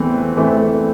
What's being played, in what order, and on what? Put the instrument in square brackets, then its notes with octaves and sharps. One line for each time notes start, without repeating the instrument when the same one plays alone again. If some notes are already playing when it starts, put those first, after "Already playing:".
Already playing: [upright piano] E2 E3 A3 C4
E3 A3 C4